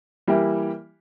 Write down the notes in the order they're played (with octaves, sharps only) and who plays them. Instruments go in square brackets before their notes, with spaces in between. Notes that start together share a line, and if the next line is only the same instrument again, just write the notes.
[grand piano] E3 G3 A#3 E4 G4